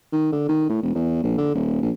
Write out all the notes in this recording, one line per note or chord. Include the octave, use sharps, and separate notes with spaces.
D#3
D3
D#3
A2
E1
E2
A#1
D3
D#1
A#1